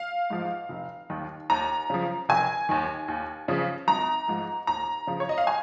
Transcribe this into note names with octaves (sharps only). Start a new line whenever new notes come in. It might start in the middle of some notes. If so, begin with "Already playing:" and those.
Already playing: F5
G#2 F3
F1
D#2 D#3
D#2 A#5
C#3 F3
F1 G#5
D#2 D#3
D#2
C#3 F3
G#1 A#5
G#2 F3
D#2 A#5
C#3 F3
C#5
D#5
F5
G#5